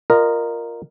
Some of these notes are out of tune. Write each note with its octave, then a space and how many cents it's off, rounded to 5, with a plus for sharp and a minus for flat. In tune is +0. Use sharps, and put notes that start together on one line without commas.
F4 +0 A#4 +0 D#5 -30